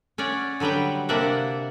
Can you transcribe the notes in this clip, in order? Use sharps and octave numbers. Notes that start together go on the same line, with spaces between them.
C#4 C#5 D5 F#5
D3 F#3 G3 B4 G5
C3 A#3 D4 D5 E5 F#5